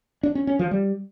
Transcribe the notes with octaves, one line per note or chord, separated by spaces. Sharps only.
D4
C#4
C#4
F3
G3